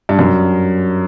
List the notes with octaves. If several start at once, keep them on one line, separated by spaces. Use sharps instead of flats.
G2
F#2